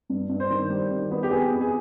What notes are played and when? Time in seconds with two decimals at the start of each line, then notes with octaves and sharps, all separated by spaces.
0.10 G2
0.29 G2
0.40 C5
0.50 D#3
0.70 G3
0.91 D#3
1.11 B3
1.23 G4
1.31 B3 G#4
1.52 F2
1.61 G#4